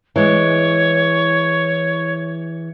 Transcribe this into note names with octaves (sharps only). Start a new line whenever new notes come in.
E3 G#3 C#5